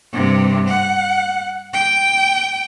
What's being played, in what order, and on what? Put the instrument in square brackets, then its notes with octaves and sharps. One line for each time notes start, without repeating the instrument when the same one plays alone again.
[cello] G2 C3
F#5
G5